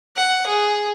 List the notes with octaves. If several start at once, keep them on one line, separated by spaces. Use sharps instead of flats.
F#5
G#4